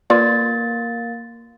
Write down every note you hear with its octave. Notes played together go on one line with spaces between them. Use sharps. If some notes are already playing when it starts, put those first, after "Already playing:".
A#3 F4 B4 D5 A6